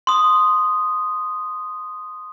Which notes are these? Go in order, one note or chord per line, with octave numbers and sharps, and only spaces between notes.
C6 D#6